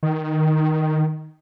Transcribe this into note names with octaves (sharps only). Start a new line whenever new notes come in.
D#3